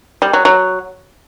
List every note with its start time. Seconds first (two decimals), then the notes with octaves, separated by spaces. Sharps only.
0.22 G3
0.33 F#3
0.45 F#3